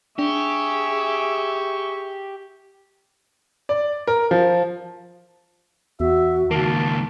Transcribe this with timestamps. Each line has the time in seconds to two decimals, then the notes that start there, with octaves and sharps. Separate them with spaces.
0.19 D4 G4 G#4 E5 C#6
3.69 D5
4.07 A#4
4.31 F3
6.00 E2 F#4 E5
6.51 C#2 D#3 A#3 A5